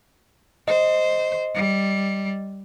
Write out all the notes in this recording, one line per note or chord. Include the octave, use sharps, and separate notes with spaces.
C5 D#5
G3